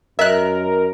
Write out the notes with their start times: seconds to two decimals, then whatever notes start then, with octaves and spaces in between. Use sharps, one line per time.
0.19 F#2 A#4 D#5 E5 F#6